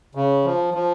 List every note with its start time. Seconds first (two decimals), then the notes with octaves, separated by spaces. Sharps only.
0.15 C#3
0.45 F3
0.74 F3